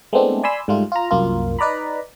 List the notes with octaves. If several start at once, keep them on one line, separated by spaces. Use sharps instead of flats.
G#3 A3 B3 C4 D4 E4
D5 G#5 B5 C6 E6
G#2 G3 A3 F4
F4 A#5
C2 F#2 A#3 F4
D#4 B4 D5 A#5 B5